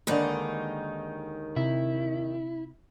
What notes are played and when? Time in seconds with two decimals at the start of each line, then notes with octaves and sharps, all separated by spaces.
0.07 D#2 D3 D#3 G#3 D#4 B4
1.56 C3 E4